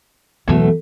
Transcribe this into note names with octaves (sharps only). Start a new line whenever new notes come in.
E2 B2 E3 F#3 A3